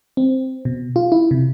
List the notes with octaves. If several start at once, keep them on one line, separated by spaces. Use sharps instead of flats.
C4
B2
F4
E4
C3